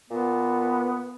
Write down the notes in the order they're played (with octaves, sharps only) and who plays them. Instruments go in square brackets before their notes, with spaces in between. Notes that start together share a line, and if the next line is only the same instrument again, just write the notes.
[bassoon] A#2 [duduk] B3